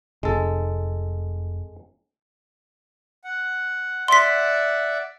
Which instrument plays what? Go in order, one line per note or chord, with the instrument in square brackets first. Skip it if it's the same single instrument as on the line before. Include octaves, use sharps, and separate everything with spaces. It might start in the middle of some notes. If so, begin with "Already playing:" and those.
[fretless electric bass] F1 [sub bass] F2 [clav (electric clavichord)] G#3 A4
[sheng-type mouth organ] F#5
[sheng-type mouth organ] D5 E5 F#5 [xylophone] C6 B6